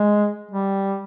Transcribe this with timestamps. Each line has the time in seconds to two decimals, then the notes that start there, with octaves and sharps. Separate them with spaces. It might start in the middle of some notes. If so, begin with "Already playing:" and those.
Already playing: G#3
0.51 G3